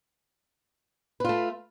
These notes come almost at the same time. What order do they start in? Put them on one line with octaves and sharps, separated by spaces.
B4 F4 A3